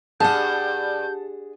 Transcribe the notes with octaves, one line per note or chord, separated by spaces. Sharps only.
G2 G#4 F#5 A5 G6